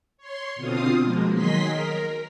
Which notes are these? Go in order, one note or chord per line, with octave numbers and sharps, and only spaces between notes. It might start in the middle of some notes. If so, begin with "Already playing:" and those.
C#5 C6
B2 D3 C4 F4 F5 D#6
B2 F3 G#3 A#3
D#3 F#3 G#4 D#5 C6 B6
A#4